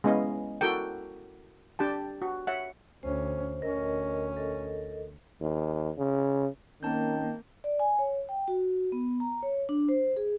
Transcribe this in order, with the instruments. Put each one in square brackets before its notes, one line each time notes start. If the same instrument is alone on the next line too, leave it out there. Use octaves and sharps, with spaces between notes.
[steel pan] G#3 B3 C#4 E4 D#5 F5
E4 F#4 A4 A#4 G5
D4 G4 G5 A5
F#4
C#5 E5 F#5
[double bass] D2 C#4 [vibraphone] C5
[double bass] D2 C#4 [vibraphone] A#4 D#5
[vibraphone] A4 A#4 D#5
[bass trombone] D#2
C#3
[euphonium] D#3 [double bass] A#3 [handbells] C4 A5 G6 [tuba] C#4
[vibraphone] D5
G#5
C#5
G5
F#4
B3
A#5
C#5
D4
C5
G#4